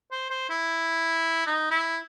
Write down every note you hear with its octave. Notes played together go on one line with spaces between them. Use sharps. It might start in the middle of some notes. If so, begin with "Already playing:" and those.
C5
C5
E4
D#4
E4